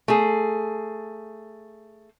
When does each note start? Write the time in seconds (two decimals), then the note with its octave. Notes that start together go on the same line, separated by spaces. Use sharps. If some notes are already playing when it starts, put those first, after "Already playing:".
0.08 A3 G#4